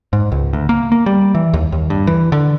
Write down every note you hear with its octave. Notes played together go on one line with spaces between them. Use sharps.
G#2
C#2
D2
A#3
A#3
G3
E3
D#2
D#2
G2
E3
D3